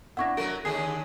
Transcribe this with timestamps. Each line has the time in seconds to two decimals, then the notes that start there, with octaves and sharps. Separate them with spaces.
0.17 D4 E4 E5 F#5 C#6 A#6
0.37 F#3 A3 F#4 A#4
0.65 D#2 D3 D4 G#4 C7